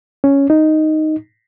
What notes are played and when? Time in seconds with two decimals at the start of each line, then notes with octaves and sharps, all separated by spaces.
0.24 C#4
0.50 D#4